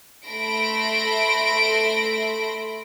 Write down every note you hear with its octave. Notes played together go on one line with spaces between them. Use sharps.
A3 E5 B5 C6 A#6 D7